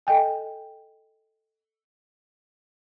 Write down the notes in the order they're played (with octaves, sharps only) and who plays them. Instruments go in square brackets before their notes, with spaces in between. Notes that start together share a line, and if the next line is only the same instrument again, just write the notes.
[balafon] A4 D#5 G5 G#5